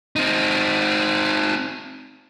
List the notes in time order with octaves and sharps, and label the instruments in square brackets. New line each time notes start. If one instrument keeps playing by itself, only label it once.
[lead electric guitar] C4 D#4